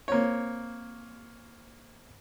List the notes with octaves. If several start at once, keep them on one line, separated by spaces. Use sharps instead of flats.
A#3 C4 C#5